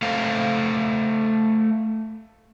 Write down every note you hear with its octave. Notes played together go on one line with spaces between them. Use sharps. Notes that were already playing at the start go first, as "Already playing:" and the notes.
A3 A4 C5 F5